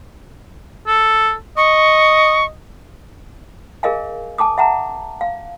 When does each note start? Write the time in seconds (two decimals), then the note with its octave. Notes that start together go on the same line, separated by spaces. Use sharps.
0.87 A4
1.57 D#5 C#6
3.83 G#4 A#4 D#5 F5 G#5
4.38 G#5 A5 D6 D#6
4.58 E5 F#5 A5 A#5
5.21 F5